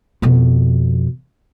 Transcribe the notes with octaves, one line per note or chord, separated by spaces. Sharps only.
F2 B2